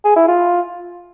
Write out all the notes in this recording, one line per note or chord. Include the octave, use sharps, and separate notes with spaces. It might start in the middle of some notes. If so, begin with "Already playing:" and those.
G#4
E4
F4